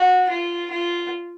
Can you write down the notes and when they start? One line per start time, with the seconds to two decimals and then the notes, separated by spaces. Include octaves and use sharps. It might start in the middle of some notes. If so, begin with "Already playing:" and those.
Already playing: F#4
0.30 F4
0.71 F4